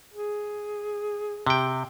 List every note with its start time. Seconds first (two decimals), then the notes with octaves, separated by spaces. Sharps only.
0.14 G#4
1.47 C3 G5